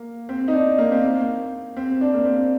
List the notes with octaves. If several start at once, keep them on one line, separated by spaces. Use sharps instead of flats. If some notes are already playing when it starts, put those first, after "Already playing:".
Already playing: A#3
C4
D#4
D4
A#3
C4
A#3
C4
D4
A#3
C4